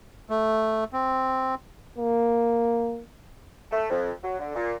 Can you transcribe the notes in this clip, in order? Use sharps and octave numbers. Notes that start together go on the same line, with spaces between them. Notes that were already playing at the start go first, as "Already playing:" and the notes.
A3
C4
A#3
A3
F2
F#3
D3
A#2